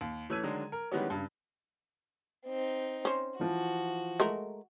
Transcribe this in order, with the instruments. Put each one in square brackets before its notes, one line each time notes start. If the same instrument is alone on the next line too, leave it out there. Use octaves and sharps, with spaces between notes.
[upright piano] D#2
E3 A3 C#4 E6 G#6 D#7
D3 D#3 F#3 G#3 D4
A#4
D#3 E3 G3 G#3 B3 C#4
G2 C#3
[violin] C4 D#4
[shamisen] C#4 C5
[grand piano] E3 F3 [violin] F#4
[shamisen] G#3 A3 A#4